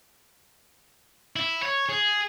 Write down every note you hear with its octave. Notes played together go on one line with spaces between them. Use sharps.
E4
C#5
G#4